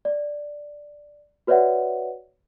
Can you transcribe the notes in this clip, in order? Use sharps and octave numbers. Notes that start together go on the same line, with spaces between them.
D5
F#4 B4 C#5 D5 E5 F#5